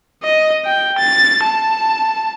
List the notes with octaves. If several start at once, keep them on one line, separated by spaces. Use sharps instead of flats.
D#5
G5
A6
A5